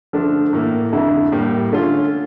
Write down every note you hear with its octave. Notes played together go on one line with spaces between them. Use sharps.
D3 F3 A3 D4
A2 E3 A#3
F2 D3 A3 E4
A2 G3 A#3
D3 A3 C#4 F4